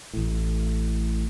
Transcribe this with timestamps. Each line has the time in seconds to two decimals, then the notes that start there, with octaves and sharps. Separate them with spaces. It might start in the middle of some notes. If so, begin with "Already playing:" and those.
0.13 A1 A2